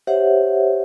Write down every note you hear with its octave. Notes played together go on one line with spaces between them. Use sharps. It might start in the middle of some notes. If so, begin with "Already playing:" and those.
G4 C5 C#5 E5 F#5